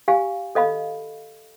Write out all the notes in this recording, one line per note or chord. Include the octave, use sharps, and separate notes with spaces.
G4 F5 G#5
A4 D#5 F5 B5